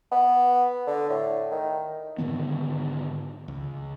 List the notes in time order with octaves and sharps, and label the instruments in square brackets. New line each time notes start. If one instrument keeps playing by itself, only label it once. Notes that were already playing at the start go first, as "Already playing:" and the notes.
[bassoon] B3
D3
A2
D#3
[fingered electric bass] G#2 D3 D#3 B3
C#2